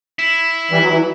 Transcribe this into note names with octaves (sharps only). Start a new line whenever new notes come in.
E4
E3 G3
F#3
E3